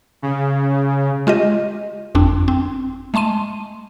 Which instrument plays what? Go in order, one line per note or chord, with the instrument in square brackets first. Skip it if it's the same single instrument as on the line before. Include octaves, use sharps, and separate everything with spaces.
[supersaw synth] C#3
[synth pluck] G#3 F4 G4 D#5
G1 F2 C4 D4
C4
G#3 A3 A5 C6 D#7